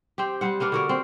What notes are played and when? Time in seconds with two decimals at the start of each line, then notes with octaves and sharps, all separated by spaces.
0.18 C4 G4
0.41 G3 C4 F#5
0.60 A#3 B3 D4 A#4
0.72 D3 F#4 A#4
0.89 C4